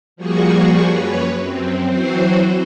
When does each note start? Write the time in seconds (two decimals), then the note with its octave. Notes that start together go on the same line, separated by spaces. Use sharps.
0.16 F3 G3 A#3 F#4 G#4 C#6
0.88 F#2 B4 C#5
1.37 F#2 C4
1.87 E3 F#3 C4 F#4 C5